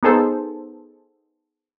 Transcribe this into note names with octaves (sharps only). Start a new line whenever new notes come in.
B3 D#4 G#4 A4 C5